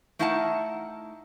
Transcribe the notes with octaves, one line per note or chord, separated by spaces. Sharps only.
A3 D#4 E4 F5 F#5 A5